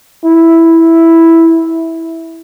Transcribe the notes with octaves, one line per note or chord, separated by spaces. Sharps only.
E4